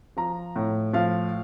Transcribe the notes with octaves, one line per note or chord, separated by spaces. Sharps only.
F3 A#5
A2
F3 F5